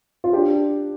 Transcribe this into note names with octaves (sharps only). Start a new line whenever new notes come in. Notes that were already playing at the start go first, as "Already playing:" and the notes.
F4
D4 G4